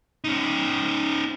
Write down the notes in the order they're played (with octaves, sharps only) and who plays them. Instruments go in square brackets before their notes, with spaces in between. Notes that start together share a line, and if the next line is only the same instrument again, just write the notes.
[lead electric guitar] C#4 D#4